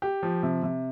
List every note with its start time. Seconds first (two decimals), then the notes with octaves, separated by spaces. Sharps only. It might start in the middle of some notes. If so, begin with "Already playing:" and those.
0.02 G4
0.23 F3
0.43 C3
0.63 C3